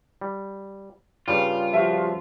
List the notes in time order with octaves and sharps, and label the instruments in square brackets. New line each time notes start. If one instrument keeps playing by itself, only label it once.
[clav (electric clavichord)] G3
[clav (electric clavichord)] G2 C#3 G3 [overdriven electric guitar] F4
[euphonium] F3 [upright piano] F#4 G4 E5